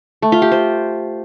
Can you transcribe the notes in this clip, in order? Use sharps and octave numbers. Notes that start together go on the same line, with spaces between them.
A3
F4
G4
C5